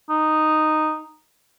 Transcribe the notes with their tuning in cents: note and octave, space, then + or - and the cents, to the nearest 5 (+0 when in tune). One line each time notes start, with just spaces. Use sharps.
D#4 -5